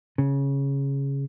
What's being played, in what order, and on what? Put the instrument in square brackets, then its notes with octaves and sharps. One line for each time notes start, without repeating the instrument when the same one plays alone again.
[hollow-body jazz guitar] C#3